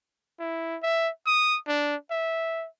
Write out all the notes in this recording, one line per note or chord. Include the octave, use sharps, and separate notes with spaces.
E4
E5
D#6
D4
E5